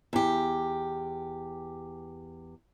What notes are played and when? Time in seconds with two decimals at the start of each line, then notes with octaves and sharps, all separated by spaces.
0.13 E2 G4